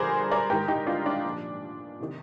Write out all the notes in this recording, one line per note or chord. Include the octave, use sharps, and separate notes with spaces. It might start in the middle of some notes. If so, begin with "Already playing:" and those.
Already playing: G2 D3 F3 G#4 A#4 C5 D5
A#4 D5
G#2 D#3 G4 A#4
D#4 G4
D4 F4
D4
A#2 F3
C3 D#3